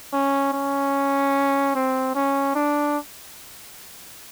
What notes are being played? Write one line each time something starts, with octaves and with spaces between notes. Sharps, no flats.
C#4
C#4
C4
C#4
D4